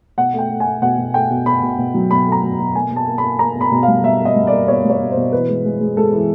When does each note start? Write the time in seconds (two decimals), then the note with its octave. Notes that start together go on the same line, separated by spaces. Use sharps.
0.18 B2 F#5
0.33 A3
0.39 G5
0.50 A3
0.60 G#5
0.66 A3
0.82 B2 F#5
0.98 B2
1.14 A3 G5
1.30 B2
1.46 B2 B5
1.62 B2
1.79 B2
1.94 F#3
2.11 B2 B5
2.27 A3
2.32 A#5
2.43 B2
2.59 B2
2.75 A#3 G#5
2.91 B2
2.96 A5
3.08 A#3
3.18 B5
3.24 A#3
3.39 A#3 A#5
3.56 B2
3.61 B5
3.72 B2
3.83 F5
3.88 G3
4.04 B2 E5
4.20 A#3
4.25 D#5
4.36 G3
4.47 A#3 D5
4.68 B2 C#5
4.85 G3 C#5
5.00 B2
5.11 C5
5.16 B2
5.32 E3 B4
5.49 G#3
5.65 G#3
5.81 G#3
5.97 G#3 A4
6.13 E3